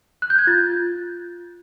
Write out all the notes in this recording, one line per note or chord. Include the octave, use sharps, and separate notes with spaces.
F#6
G6
G#6
F4 A6